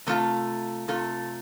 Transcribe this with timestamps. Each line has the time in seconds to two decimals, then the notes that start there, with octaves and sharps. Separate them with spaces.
0.07 C3 A3 F4 A4
0.88 C3 A3 F4 A4